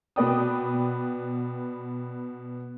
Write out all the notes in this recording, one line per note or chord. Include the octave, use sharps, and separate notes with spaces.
B2 B3 B4 D5 G5 D#6